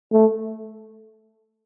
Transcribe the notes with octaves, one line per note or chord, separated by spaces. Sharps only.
A3